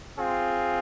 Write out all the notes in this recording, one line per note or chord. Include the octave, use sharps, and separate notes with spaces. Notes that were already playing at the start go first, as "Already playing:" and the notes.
C4 F4 G#4